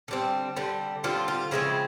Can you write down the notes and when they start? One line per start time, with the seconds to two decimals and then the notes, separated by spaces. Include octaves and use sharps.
0.08 D3 G3 C4
0.57 D3 G3 C4
1.04 D3 G3 C4 F4
1.28 F4
1.51 C#3 F3 G#3 C4 E4